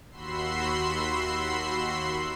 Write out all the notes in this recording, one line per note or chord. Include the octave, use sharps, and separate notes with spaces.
D#2 F#4 B5 C6 E6 C7